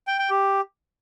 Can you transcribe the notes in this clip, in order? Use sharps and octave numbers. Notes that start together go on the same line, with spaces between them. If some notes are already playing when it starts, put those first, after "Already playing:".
G5
G5
G4